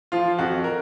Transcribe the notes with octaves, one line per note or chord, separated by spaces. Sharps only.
F3 F4
F2 F#4
A#4